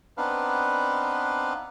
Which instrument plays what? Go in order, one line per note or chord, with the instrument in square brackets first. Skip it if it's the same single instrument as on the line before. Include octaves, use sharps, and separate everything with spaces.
[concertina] B3 C4 D4 D#4 B4 F5